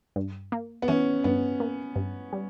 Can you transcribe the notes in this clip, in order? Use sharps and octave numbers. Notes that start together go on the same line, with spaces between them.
G2
A#3
B3
E3 C#4
G2 B3
A#3
G2
G3